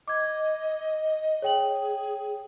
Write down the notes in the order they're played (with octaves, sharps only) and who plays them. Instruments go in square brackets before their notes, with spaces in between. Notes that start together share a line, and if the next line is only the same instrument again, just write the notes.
[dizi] D#5 [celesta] D6 G#6
[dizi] G#4 [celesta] C#5 G5 F#7